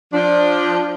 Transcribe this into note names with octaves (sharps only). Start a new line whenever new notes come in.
F3 D4